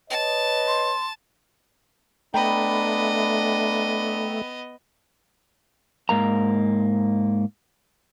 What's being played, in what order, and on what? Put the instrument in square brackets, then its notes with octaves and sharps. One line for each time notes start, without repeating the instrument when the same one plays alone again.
[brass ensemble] B4 C#5 D#5 [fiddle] A5
[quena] C6
[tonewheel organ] A3 [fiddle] B3 D#5 [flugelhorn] D4 [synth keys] G5 A#5 B5
[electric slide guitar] G#2 A#3 A#5